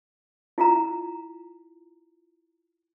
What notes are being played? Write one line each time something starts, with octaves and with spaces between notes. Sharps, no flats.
E4 F4 A#5